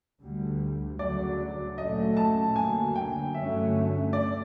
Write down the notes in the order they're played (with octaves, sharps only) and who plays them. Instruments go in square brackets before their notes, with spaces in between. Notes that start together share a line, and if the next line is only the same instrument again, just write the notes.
[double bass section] D2 D3 G3
[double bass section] D2 C#3 F#3 [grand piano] D5
[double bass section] A#2 F#3 A3 C#4 [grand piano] D#5
[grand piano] A5
[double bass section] D2 D3 F#3 A#3 [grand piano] G#5
[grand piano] G5
[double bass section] G2 D3 F#3 A3 C#4 [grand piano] E5
[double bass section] A3 [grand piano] D5